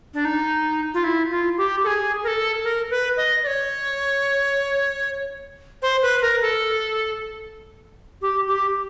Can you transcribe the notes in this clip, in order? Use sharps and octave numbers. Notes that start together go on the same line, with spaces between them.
D4
D#4
F4
E4
F4
G4
A4
G#4
A#4
A4
A#4
B4
D#5
D5
C#5
C5
B4
A#4
A4
G4
G4